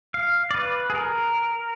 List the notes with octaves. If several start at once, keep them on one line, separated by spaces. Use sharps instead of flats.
F5
D5
B4
G#4
A#4